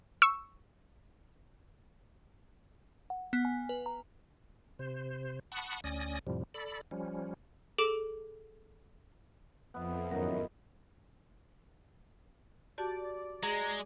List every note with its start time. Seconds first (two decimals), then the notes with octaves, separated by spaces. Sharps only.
0.22 C#6 E6
3.10 F#5
3.33 B3
3.45 G#5
3.69 B4
3.86 A#5
4.79 C3 C5
5.52 F#5 A5 B5 C#6 D#6 F#6
5.84 D2 C#4 D5 G#5 D#6 A#6
6.27 F2 A2 C3 F3 G3
6.54 A4 D5 B5
6.91 F3 G3 C#4
7.78 G#4 A4 D6 D7 E7
9.74 F2 B3 E5
10.11 G#1 F#2 A2 B3 D#4 A#4
12.78 F#4 G4 D5 A5
13.43 G#3 G#4 A#5